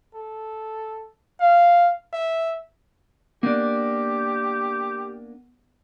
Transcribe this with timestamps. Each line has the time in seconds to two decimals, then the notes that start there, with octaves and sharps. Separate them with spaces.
0.15 A4
1.40 F5
2.13 E5
3.43 A#3 B3 D4 G4